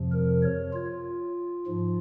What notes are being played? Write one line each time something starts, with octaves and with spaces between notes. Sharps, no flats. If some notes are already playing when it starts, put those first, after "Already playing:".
Already playing: F2 C3 F3
A#4
C#5
F4
G#2 F3